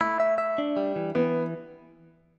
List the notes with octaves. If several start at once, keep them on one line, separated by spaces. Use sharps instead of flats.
A3 E4
E5
E5
D4
G3
E3
E3 B3